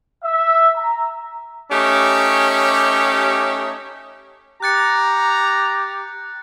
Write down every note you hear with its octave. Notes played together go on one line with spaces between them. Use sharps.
E5
A#5
A3 C#4 D#4 G4
G4 A#5 F#6 A6 C#7